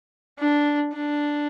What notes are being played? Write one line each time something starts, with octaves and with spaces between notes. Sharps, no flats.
D4
D4